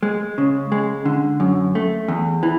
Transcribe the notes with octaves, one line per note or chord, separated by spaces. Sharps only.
G#3
C#3
G#3
D3
F#2
A3
E2
E3